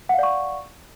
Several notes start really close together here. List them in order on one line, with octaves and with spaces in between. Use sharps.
F#5 F5 D5 C#6